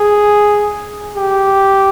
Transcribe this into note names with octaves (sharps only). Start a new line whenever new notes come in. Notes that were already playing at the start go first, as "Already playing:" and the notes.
Already playing: G#4
G4